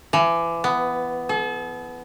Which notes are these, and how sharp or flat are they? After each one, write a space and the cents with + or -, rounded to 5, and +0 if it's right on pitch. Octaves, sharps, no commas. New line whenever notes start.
E3 +30
B3 +10
A4 -40